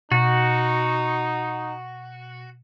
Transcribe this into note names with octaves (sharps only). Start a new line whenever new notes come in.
B2 D#4 F#4